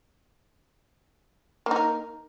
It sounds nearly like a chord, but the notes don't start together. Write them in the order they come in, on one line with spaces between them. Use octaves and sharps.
A#3 D#4 A#4